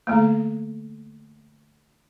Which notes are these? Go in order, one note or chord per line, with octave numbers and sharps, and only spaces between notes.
D3 A3 A#3